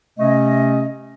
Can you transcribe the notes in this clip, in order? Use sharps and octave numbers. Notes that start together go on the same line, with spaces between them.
C3 A3 C#4 D#5